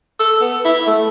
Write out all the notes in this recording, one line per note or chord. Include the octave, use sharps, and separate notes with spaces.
A4
B3
E4
A3